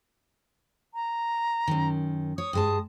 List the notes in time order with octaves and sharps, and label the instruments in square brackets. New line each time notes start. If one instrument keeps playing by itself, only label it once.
[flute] A#5
[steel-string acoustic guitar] F#2 D#3
[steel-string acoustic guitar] C#5 [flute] D#6
[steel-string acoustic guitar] G2 G#3 A5